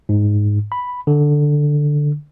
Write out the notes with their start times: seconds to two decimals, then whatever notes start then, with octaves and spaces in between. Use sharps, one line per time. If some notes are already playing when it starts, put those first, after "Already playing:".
0.09 G#2
0.72 B5
1.07 D3